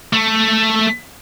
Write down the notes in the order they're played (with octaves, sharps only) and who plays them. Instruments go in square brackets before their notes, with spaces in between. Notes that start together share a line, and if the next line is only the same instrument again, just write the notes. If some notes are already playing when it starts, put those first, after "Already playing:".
[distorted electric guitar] A3